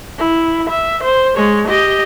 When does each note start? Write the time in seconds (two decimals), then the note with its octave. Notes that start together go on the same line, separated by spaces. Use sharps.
0.18 E4
0.69 E5
1.03 C5
1.36 G#3 C#5
1.68 G4 D#5